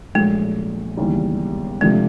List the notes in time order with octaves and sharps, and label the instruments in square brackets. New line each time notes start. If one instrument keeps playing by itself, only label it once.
[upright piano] A#1 A#2 F#3 A3 [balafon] G#3
[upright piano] E1 D#2 C#3 E3 G3
[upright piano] C3 F3 A3 D4 [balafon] G#3